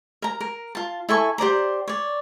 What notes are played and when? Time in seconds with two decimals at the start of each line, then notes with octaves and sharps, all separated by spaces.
0.22 A#4 A#5
0.41 A#4
0.75 F4 A5
1.09 E4 A4 G#5 C#6
1.38 G4 C5 D5 A#5
1.88 C#5 D5